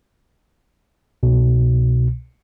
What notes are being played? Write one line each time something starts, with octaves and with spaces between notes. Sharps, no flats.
C2 B2